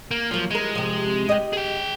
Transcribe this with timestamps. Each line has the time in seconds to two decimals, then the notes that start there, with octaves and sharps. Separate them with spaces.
0.11 A#3
0.31 F3 F#3 A#3
0.51 E3 G#3 A#4
0.75 C3 F3
1.29 G4 D#5
1.53 G#4 G5